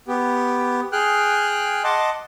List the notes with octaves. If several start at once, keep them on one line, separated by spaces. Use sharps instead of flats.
B3 G4
G#4 G5 F6 F#6
D#5 F#5 A5 C6 D6